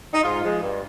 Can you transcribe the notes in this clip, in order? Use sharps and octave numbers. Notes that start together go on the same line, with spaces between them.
D#4
G#2 F4
F3 G#3
G2